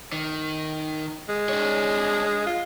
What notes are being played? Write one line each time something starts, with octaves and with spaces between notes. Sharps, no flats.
D#3
G#3
D4 C#5
F4